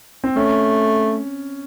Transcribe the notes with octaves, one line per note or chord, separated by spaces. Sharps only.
C4
A3 C#4